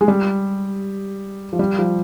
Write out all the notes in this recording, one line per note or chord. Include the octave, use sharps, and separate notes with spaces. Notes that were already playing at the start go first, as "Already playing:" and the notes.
G#3
G3
F3
G3
F3